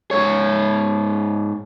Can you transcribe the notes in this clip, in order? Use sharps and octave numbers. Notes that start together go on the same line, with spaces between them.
G#2 C#5